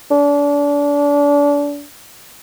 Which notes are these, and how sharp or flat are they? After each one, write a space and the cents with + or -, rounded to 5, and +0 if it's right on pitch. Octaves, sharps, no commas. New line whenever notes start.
D4 -30